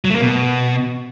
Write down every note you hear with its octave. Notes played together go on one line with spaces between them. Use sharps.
F#3
A3
A#3
B2